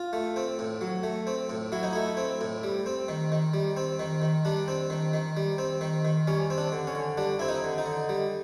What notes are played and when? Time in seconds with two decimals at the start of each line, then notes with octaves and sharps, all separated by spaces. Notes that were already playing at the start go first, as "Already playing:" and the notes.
Already playing: F4
0.13 A3
0.36 C4
0.59 A2
0.81 F#3
1.03 A3
1.27 C4
1.49 A2
1.72 F#3 E4
1.83 D#4
1.93 A3 E4
2.17 C4
2.41 A2
2.63 G3
2.86 C4
3.08 D#3
3.32 D#3
3.54 G3
3.77 C4
3.99 D#3
4.22 D#3
4.45 G3 D4
4.68 C4
4.90 D#3
5.14 D#3
5.37 G3
5.58 C4
5.81 D#3
6.05 D#3
6.27 G3 C#4
6.50 C4
6.58 D4
6.72 D3
6.87 C#4
6.95 D3
7.18 G3 D4
7.39 C4 E4
7.48 D#4
7.64 D3
7.78 D#4
7.86 D3
8.09 G3